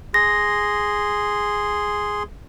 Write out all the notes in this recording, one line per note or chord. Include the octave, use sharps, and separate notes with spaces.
G#4 C6 A#6